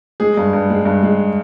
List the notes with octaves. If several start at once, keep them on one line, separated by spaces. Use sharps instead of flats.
G#3 G#4
G2
G2
G#3
G2
G#3